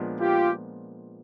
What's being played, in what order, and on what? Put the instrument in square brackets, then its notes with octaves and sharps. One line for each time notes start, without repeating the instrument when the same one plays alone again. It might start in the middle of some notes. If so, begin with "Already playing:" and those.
Already playing: [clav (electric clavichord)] A#2 F3 G#3 B3 D4
[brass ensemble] F4 G4